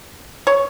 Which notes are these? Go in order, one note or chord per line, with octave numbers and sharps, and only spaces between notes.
C#5